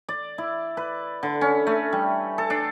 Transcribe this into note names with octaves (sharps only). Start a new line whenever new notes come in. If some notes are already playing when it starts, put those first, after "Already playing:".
D5
E4
B4
D3
C#4
A3
G3
A4
D4